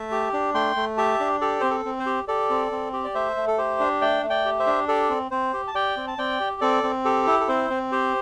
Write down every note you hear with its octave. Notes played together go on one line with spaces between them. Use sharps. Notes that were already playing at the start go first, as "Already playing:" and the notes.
Already playing: A3 E5 A5
G4
D4
A3 G5 C6
A3
G4 E5 A5
D4
G4 A4 D5
C4 C5
A4
C4
C5
G4
G4 A4 D5
C4
C4
G4
D5
A3 C5 E5
A3
A4
G4 C5
D4
A3 D5 G5
A3
D5 G5
G4
C5 E5
D4
G4 A4 D5
C4
C4 C5
G4
A5
G4 D5 G5
C4
A5
C4 D5 G5
G4
C4 A4 D5
C4
G4 A4
E4
A4
C4 C5
C4
G4 C5